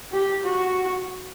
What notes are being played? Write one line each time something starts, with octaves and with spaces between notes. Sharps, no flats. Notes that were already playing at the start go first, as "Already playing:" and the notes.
G4
F#4